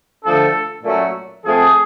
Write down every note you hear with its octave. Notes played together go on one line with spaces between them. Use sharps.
D3 F3 A3 D4 A4
A#2 F#3 A3 C#4
F3 A3 C4 G#4